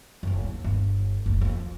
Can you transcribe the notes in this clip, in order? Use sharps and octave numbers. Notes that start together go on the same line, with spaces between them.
F#1 F#2
D#2
G1
F#1 D2
F2